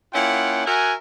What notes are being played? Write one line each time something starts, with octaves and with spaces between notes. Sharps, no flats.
A#3 C#4 E4 F4 F#5 G5
F#4 A#4 E5 F#5 G#5